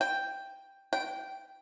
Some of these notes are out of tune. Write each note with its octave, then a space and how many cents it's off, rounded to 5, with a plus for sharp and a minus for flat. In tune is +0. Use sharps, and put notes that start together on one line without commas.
G5 +0
G5 -15